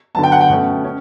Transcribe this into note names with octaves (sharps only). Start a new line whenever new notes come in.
D3 F#3 B3 A5
G5
F#5
G5
B2 A3 C#4
C#4